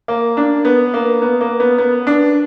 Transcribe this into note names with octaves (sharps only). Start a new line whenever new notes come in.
A#3
D4
B3
A#3
B3
A#3
B3
B3
D4